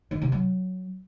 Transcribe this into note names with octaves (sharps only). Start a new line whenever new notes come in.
D#3
C3
F#3